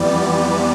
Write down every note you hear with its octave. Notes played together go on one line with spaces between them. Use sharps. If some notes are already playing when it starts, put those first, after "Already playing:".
Already playing: F2 E3 G3 B3 D5